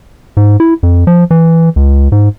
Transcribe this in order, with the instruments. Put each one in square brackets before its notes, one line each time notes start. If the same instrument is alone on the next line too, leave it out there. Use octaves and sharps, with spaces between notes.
[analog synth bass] G#2
E4
F2
F3
E3
C#2
G#2